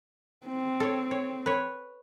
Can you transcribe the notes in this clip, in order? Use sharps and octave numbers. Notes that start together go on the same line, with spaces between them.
C4
A4 C#5
C#5
B4 C#5